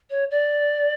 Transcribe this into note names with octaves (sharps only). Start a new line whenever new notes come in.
C#5
D5